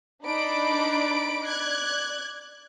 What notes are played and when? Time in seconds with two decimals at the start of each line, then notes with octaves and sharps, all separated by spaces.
0.24 D4 D#4 D5 B5 D7
1.43 D5 F#6 G#6